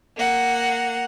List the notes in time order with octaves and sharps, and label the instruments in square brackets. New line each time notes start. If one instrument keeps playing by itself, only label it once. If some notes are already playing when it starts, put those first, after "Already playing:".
[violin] A#3 F#5